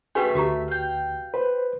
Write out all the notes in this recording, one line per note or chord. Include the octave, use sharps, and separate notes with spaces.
A3 C#4 F#4 G#4 B4 E5 G5 G#5
D2 F#4 G4 A#5
F5 G5
B4 C5